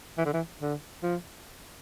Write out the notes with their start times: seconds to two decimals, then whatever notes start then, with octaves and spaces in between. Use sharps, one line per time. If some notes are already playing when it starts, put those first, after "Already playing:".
0.18 E3
0.25 D3
0.33 E3
0.61 D3
1.03 F3